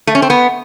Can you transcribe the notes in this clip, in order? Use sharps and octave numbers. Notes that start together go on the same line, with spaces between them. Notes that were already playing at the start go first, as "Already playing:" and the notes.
A3
C#4
C4
B3